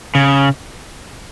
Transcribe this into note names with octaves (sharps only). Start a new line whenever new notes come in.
C#3